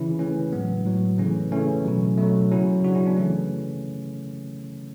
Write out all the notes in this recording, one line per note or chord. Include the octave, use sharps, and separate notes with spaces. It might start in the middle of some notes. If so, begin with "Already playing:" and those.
Already playing: C#3 E3 C#4 E4
C#3 E3 A3 C#4
A2 F#3 G#3 B3
A2 F#3
C#3 E3 A3 C#4
C#3 E3 A3 C#4
B2 F#3
B2 F#3 A3
C#3 F#3 C#4 E4
C#3 F#3 D4 F#4
C#4 E4
B3 D4
C#3 E3 A3 C#4